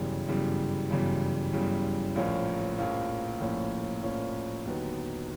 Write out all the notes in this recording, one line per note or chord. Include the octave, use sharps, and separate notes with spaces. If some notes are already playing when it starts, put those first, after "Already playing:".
Already playing: G1 F#2 C#3 E3 G3
G1 F#2 C#3 E3 G3
G1 F#2 C#3 E3 G3
G1 F#2 C#3 E3 G3
A#1 A2 F3 A#3 C#4
A#1 A2 F3 A#3 C#4
A#1 A2 F3 A#3 C#4
A#1 A2 F3 A#3 C#4
D#2 D3 F#3 B3 D#4